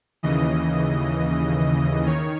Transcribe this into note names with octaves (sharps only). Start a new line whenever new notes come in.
D#2 C#3 E3 D#5
D#3 C#5